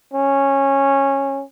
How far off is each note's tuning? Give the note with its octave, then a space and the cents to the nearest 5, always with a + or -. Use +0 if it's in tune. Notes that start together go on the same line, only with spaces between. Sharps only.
C#4 -15